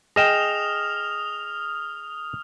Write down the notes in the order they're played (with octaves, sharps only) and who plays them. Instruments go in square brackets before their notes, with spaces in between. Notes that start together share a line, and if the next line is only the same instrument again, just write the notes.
[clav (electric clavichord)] G#4 D#5 G5 [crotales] D#6 F6 F7 [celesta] A#6 E7